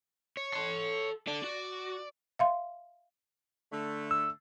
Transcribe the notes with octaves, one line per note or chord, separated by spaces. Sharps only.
C#5
A4 C6
D3 D5
F#4
E5 F5 C6
D3 A3
E6